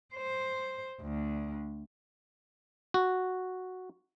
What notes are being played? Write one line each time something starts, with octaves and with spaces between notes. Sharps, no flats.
C5
D2
F#4